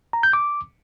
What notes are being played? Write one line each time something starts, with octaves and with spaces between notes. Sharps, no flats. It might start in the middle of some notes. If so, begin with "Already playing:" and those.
A#5
G6
D6